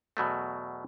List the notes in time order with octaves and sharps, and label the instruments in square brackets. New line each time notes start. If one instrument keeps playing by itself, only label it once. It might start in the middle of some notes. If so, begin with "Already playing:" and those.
[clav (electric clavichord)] E2 B2 F#3 A3